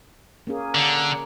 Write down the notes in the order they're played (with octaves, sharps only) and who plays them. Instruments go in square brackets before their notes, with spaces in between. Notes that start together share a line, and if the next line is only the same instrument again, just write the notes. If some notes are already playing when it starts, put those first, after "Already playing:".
[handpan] A#3 C#4 G#4
[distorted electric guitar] D3